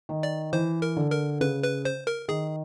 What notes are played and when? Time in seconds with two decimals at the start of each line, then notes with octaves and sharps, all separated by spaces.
0.09 D#3
0.23 D5
0.53 E3 C5
0.82 A#4
0.97 D3
1.11 A#4
1.41 C#3 B4
1.63 B4
1.85 C5
2.07 A#4
2.28 D#3 G#4